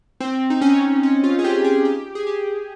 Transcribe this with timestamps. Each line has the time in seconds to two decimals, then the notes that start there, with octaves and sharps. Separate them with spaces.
0.20 C4
0.50 D#4
0.61 C#4
1.03 C#4
1.24 F4
1.39 G#4
1.44 G4
1.64 G#4
1.85 G4
2.15 G#4
2.27 G4